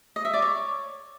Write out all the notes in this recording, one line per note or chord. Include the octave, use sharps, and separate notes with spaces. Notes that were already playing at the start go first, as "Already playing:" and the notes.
D#5
E5
D5
C#5